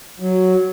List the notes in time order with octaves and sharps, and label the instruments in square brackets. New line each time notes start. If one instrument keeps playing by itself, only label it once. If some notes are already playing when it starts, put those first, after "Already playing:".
[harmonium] F#3